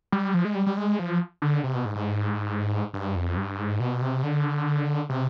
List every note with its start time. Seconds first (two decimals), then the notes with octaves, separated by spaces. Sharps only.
0.12 G3
0.34 F3
0.45 G#3
0.55 G3
0.66 G3
0.77 G#3
0.99 F3
1.42 D3
1.63 C3
1.75 B2
1.85 G#2
1.96 G#2
2.94 G2
3.15 F2
3.37 G2
3.59 G#2
3.80 B2
4.02 C3
4.23 D3
5.09 C3